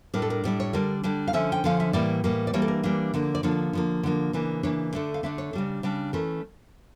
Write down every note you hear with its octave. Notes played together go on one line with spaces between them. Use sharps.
A2 G3 D4 A#4
A4
A#4
A2 G3 D4 D5
C#5
D3 G3 D4 A#4
D3 G3 D4
F5
D3 F3 C#4 E5
G5
D3 F3 C#4 F5
E5
A2 E3 G3 A#3 D5
A2 E3 G3 A#3
D5
E3 G3 A#3 D4 C#5
A4
A#4
E3 G3 A#3 D4
D3 F3 A#3 D4
D5
D3 F3 A#3 D4 C#5
D3 F3 A#3
D3 F3 A#3
C#3 E3 A#3 D4
C#3 E3 A#3 D4 C#5
D3 A3 D4
F5
D3 A3 D4 E5
C#5
C#3 G3 D4
C#3 G3 D4
E3 A3 C#4 A#4